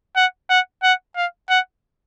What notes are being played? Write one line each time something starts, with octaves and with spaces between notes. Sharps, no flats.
F#5
F#5
F#5
F5
F#5